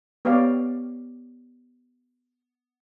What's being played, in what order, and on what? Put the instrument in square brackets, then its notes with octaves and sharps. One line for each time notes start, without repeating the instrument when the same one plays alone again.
[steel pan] B3 G4 C#5 D5 F5